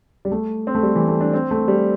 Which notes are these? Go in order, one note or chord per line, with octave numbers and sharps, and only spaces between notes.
G3
A3
C4
A3
G3
E3
A3
D4
C4
A3
G3